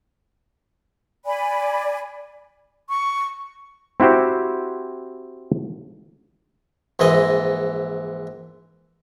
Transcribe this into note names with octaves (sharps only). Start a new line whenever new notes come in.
D5 G#5 B5
C#6
C4 E4 F#4 G4 C5
A#1 G#2 E3 D#5